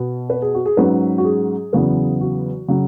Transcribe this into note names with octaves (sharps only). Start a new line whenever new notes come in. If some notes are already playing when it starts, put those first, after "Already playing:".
Already playing: B2 B3
B4
G#4
F#4
G#4
G#2 F#3 C#4 B4
F#4
G#4
E2 C#3 F#3 B3
F#4
C#3 F#3